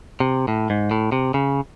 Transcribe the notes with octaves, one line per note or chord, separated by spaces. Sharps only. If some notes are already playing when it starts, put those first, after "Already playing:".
C3
A2
G#2
A2
C3
C#3